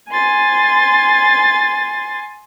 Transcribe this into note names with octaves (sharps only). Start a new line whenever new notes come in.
G#5 C6 A6